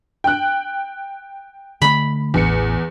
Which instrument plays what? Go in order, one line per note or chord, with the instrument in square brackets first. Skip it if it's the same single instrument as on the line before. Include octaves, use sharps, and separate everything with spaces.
[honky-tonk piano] G5 F#6
[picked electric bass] D3 A3 [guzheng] B5
[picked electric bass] A1 [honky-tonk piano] E2 C#7